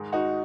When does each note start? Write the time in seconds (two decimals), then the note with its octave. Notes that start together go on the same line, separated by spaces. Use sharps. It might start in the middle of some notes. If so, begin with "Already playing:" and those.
Already playing: G#2 D#3 G#3
0.12 D#4 F#4